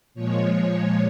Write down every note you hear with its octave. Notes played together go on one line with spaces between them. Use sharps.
A#2 F3 G#3 C#5